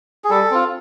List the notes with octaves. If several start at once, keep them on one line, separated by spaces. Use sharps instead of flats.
G#4
G3 A4
C4 F4